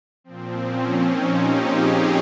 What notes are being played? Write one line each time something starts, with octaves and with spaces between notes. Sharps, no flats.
A#2 F3 C4
C#4
D#4
G4
G#4